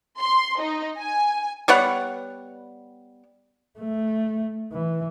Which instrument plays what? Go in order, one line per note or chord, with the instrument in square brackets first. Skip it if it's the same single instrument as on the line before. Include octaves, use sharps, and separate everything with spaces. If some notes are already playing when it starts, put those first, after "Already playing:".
[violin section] C6
D#4
G#5
[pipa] G3 B3 C#5 F#5
[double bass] A3
E3